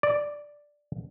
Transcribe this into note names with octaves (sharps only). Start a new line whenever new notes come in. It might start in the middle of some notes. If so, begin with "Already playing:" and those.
D5